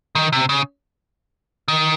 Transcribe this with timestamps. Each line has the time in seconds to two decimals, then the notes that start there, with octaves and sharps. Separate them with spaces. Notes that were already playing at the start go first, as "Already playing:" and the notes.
0.15 D#3
0.33 C3
0.49 C#3
1.68 D#3